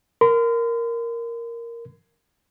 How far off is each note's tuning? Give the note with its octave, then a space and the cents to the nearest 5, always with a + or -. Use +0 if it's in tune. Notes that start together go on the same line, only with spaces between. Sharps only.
A#4 +0 C6 -40